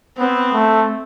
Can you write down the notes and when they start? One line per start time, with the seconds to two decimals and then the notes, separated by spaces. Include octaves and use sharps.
0.18 B3 C4
0.52 A3